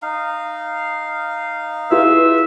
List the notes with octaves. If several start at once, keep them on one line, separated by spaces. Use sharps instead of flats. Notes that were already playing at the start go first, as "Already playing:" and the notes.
D#4 F5
E4 F4 G#4 B4 E5